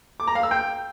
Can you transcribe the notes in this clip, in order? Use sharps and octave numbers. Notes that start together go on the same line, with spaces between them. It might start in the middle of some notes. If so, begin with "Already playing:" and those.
D6
A#5
F5
E6
G5